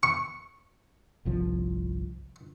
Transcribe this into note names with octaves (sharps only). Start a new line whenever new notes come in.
C#6
G1 C2 F3